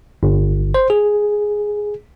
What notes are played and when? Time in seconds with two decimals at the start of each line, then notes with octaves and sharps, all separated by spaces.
0.23 G1
0.74 C5
0.90 G#4